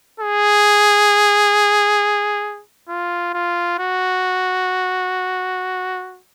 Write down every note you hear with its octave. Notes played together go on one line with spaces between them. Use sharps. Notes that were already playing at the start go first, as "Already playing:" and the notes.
G#4
F4
F4
F#4